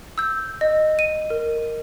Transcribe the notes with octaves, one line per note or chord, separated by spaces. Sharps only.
E6 G6
D#5
D#7
A#4